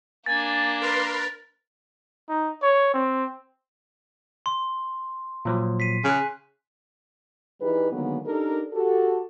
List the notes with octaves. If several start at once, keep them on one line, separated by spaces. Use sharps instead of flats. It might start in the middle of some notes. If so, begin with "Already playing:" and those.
A#3 D4 G#5 A6
A#4 B4 C6
D#4
C#5
C4
C6
A#2 F3 F#3
B6 C7 D#7
C#3 G#5 F#6
E3 G3 D#4 G#4 B4
D3 D#3 F#3 G#3 A#3 B3
D4 D#4 G4 A4 A#4
F#4 G4 A4